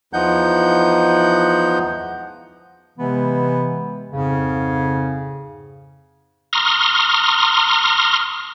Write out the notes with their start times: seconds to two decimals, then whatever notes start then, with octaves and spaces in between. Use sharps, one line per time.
0.13 E2 E3 F3 D#4 F#5 G6
2.99 C3 E3 G#3 B3
4.11 F2 G#2 C#3
6.53 A#5 C6 C#6 D#6 F6